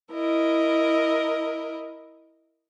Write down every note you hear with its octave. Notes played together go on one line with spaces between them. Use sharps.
E4 A#4 D#5